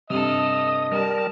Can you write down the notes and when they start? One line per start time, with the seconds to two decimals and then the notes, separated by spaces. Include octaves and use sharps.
0.10 G2 C3 A4 D#5 D#6 F6
0.92 G3 A#4 A5